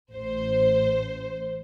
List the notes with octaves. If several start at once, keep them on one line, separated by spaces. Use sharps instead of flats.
A1 C5